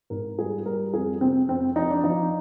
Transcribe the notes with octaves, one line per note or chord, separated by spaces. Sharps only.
G#2 A#4
G3 G#4
G3 A#4
F2 G#4
C3 C4
F2 C4
F3 D#4
D4
F3 D#4